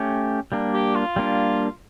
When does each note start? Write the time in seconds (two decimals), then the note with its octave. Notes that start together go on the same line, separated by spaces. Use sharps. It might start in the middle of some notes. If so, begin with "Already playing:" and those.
Already playing: A3 C#4 G4
0.52 G3 A#3 D4
0.74 G4
0.95 F4
1.16 G3 A#3 D4